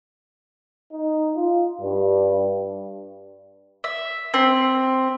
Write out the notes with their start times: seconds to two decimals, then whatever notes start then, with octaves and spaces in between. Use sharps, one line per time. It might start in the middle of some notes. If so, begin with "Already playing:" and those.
0.93 D#4
1.36 F4
1.81 G2
3.84 E5
4.34 C4